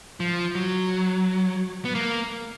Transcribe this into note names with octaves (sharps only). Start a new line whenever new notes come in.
F3
F#3
B3
A#3